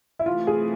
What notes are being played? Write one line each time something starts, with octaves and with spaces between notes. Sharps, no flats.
E4
C3 E3 A3 F4
G#4